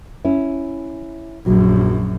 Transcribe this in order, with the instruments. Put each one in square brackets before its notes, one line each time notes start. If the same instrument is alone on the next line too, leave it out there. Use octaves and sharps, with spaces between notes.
[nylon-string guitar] C#4 E4
[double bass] A#1 F#2 [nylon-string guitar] F#3